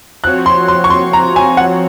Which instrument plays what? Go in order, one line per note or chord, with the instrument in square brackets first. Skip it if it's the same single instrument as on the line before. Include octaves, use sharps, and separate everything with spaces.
[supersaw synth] F3 C4 F#4 C#5 [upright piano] F#6
[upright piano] C6
C6
C#6
C6
A#5
G#5
F#5